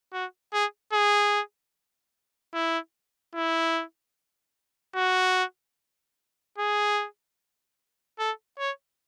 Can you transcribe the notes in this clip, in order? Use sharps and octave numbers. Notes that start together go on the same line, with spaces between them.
F#4
G#4
G#4
E4
E4
F#4
G#4
A4
C#5